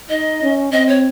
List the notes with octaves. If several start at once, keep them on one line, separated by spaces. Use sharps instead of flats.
D#4 D#5
C#4
C4 D#5
C#5